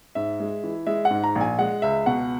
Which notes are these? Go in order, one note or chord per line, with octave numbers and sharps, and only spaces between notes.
G#2 E5
G#3
E3
G#3 E5
F#5
G#2
A#5
A#1
G#5
G#3 F#5
C#2 E5
B2 F#5